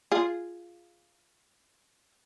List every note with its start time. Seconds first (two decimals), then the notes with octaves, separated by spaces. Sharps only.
0.12 F4 G#4